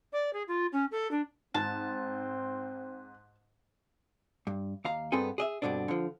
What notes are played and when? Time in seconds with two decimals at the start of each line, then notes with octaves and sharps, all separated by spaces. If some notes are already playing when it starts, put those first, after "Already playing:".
0.12 D5
0.33 G#4
0.48 F4
0.72 C#4
0.91 A4
1.11 D4
1.54 G#2 C4 A5
4.47 G2
4.85 D#2 F5 A#5
5.12 G2 B3 C4 G#4 A4 G#5
5.38 G#4 D#5 E5
5.62 G2 B2 D3 C4 D4
5.88 D3 F3